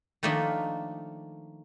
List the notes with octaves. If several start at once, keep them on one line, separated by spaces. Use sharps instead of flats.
D#3 F3 A3 A#3 D4 D#4